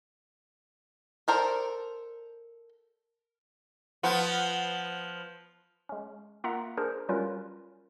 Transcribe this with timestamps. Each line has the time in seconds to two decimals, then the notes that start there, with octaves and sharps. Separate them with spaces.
1.28 A4 A#4 C5 D5
4.03 F3 B3
5.89 G#3 C#4
6.44 A#3 F4 E5 F#5 A#5
6.77 D4 G#4 A#4 C5
7.09 F#3 G3 C#4 F4 A#4 B4